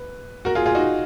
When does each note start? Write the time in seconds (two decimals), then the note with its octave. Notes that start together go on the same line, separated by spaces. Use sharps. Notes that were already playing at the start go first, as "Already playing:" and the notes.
Already playing: B4
0.45 F#4 A#4
0.55 F4 G#4
0.66 F4 G#4
0.75 D#4 F#4